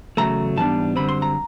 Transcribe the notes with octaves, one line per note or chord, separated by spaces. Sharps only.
E2 C#3 F#3 A3 A#5
G#2 E3 G3 B3 D4 A5
F#2 D3 G3 C4 B5
C6
A#5